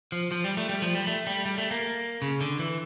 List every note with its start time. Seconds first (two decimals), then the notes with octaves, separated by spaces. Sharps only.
0.12 F3
0.32 F3
0.44 G3
0.57 A3
0.69 G3
0.82 F3
0.95 G3
1.07 A3
1.27 G3
1.46 G3
1.58 A3
1.71 A#3
2.22 C#3
2.41 D3
2.59 E3